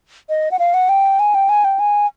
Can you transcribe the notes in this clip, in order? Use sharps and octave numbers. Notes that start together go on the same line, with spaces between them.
D#5
F#5
F5
F#5
G5
G#5
G5
G#5
G5
G#5